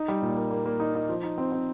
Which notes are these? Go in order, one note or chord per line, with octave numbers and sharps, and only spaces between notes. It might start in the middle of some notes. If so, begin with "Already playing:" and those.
Already playing: D#4
G3
A#2
A#3
A#3
A#3
D#4
D#4
F3
D#4
C4
C4